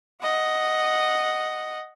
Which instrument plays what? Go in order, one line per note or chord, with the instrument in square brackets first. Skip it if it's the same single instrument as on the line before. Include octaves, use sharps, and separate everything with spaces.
[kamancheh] D#5 F#5